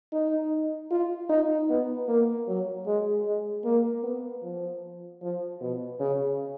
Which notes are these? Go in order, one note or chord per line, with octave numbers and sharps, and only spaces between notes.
D#4
F4
D#4
B3
A#3
F#3
G#3
G#3
A#3
B3
F3
F3
B2
C#3